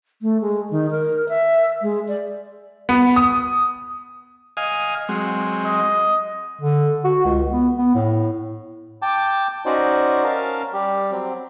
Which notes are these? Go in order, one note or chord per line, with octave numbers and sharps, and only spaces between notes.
A3
G#3
D#3
A#4
E5
G#3
D5
B3
D#6
D#5 F5 G#5
F#3 G#3 C4
D#5
D3
F#4
C#2
B3
B3
A2
G5 A5 D6
C#4 D#4 F#4 C5 D5
C#4 A#4 F5 A5
G3 G4
F#3 C4